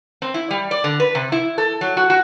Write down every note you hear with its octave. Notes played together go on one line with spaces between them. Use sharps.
C4
E4
G3
D5
D3
B4
C3
E4
A4
F#3
F#4
F#4